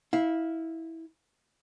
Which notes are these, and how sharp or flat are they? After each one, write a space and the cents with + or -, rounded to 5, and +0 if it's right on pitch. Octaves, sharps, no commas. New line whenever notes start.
E4 -20 F5 +0